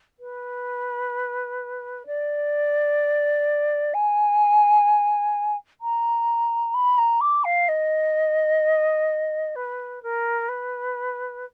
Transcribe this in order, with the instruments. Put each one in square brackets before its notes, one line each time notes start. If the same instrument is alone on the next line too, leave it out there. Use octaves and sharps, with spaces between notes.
[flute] B4
D5
G#5
A#5
B5
A#5
D6
F5
D#5
B4
A#4
B4